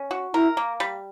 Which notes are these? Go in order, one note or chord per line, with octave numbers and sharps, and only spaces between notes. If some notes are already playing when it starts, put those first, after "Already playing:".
Already playing: C#4
F#4
E4 A#4
A#3
G3